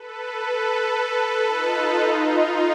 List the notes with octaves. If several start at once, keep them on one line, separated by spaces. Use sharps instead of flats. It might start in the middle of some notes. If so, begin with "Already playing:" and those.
Already playing: A4 B4
A4 B4
D#4 F4
D#4 F4